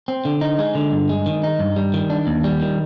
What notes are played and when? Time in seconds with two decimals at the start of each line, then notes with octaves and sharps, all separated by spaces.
0.08 C4
0.25 D3
0.41 D#4
0.59 G#3
0.75 D3
0.92 G2
1.09 G#3
1.26 D#3
1.43 D#4
1.59 G2
1.76 G3
1.94 D#3
2.10 D4
2.27 D#2
2.44 G3
2.61 D#3